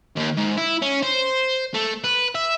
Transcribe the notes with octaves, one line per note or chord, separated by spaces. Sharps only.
D#2
G#2
E4
C#4
C5
A3
B4
E5